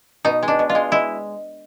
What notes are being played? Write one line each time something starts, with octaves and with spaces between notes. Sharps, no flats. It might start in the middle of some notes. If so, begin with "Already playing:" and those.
B2 D#4
G#3
D4
B2
F4
G#3
G#3 E4